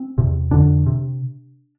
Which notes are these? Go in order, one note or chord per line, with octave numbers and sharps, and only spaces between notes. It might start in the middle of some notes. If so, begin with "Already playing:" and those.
Already playing: C4
E2 C3
F2 D3 D4
C3